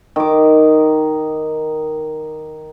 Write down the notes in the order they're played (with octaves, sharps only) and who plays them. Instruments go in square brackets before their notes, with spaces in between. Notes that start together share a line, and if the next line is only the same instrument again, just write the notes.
[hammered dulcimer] D#3 D6